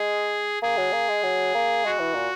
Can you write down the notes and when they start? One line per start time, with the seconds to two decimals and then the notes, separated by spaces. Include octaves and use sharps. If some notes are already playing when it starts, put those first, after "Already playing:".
Already playing: G#3 G#4
0.62 A#3 G#4
0.77 F#3
0.92 A#3
1.09 G#3
1.23 F#3
1.55 A#3
1.84 G#3 F#4
1.99 E3
2.15 A#2